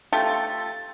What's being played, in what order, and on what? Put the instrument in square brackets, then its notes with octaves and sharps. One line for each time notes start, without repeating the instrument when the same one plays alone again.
[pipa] A3 F4 G4 A4